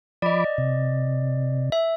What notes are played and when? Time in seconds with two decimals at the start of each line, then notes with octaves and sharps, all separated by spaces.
0.22 F3 D5 D#5 B5 D6
0.58 C3
1.72 E5